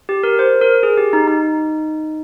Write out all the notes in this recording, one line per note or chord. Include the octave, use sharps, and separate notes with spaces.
G4
A#4
C5
A#4
G#4
G4
D#4
D#4